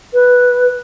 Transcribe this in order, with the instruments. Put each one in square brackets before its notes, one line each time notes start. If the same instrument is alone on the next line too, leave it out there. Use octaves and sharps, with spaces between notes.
[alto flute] B4